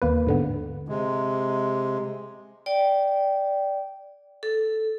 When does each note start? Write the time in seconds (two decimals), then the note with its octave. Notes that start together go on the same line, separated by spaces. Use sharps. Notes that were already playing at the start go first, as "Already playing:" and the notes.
0.02 D#2 A#3 B4
0.27 G#2 D3 B3
0.88 C3 G#3
2.66 D5 G5
4.43 A4